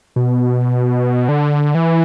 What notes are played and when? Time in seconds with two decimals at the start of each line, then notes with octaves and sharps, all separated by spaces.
0.16 B2
1.29 D3
1.75 E3